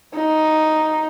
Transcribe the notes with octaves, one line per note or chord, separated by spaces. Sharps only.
D#4